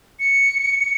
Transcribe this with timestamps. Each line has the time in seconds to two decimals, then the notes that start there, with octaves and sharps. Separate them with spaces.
0.20 C#7